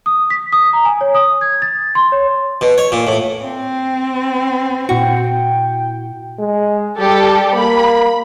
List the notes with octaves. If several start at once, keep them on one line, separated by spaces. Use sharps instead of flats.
D#6
B6
D#6
A#5
G#5
C#5
D#6
G#6
A6
C6
C#5
B2
C#5
A#2
A2
C4
A#2 E4 F#4 G5
G#3
G3 G4 A4
A#3 B5